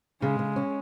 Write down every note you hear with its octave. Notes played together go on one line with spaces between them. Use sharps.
C#3 G#3
C#3
C#4